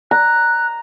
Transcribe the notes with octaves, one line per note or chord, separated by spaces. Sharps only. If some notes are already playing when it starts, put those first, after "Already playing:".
A#5 F#6